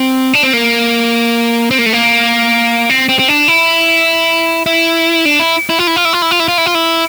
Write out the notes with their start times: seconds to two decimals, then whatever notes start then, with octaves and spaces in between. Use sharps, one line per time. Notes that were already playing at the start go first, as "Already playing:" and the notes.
Already playing: C4
0.34 D4
0.43 C4
0.53 A#3
1.71 C4
1.78 A#3
1.86 A3
1.93 A#3
2.90 C4
3.09 C4
3.19 C4
3.28 D4
3.48 E4
4.66 E4
5.25 D4
5.40 E4
5.70 E4
5.79 F4
5.87 E4
5.96 F4
6.05 E4
6.13 F4
6.22 E4
6.31 F4
6.40 E4
6.48 F4
6.58 E4
6.66 F4
6.75 E4